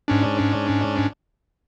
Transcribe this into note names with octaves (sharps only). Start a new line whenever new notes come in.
G#2 C#4 D4